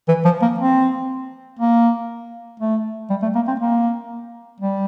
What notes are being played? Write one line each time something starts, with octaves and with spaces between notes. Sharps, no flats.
E3
F3
A#3
C4
A#3
A3
G3
A3
A#3
C4
A#3
G3